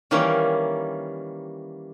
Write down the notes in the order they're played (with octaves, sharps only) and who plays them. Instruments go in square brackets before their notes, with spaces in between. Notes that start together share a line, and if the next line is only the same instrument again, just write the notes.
[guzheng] D#3 E3 G3 A#3 C#4